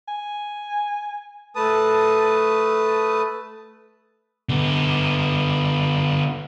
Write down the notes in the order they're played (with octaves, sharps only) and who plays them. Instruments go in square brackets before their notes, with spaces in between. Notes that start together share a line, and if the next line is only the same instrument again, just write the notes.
[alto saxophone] G#5
[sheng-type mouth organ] A3 B4 A5 D#6
[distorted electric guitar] D3 B3